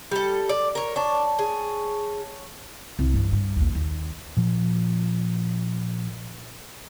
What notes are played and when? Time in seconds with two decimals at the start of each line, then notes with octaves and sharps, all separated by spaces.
0.11 G3 A4
0.49 D5
0.75 A#4 C#5
0.96 D4 C#5 A5
1.39 G#4
2.99 C2
3.14 G2 E3
3.33 G2
3.56 A#1 D#2
3.75 D#2
4.37 A#2 F3